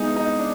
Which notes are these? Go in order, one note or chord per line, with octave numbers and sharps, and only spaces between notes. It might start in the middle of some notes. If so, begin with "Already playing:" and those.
Already playing: G#3 B3 D#4 E4 G#4
D#4
D4